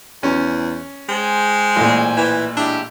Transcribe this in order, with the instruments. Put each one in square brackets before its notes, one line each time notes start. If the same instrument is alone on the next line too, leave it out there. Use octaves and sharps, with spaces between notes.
[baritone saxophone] E2 [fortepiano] C#4
[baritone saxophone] G#3 [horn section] C5 G5 G#5
[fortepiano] A1 A#2
[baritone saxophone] E3
[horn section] G#3 E4 G4 [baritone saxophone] D4